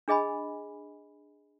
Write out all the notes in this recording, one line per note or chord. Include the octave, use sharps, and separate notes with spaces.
D4 G#4 D#5 G#5 B5